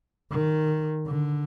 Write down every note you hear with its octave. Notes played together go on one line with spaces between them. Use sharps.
D#3
D3